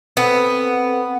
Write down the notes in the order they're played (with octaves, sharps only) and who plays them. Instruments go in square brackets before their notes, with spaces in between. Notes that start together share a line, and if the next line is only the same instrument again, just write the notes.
[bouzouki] B3 [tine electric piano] C4 A4 B4